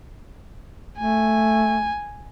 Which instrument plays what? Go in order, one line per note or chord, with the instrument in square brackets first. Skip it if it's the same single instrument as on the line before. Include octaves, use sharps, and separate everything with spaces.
[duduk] A3 [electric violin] G#5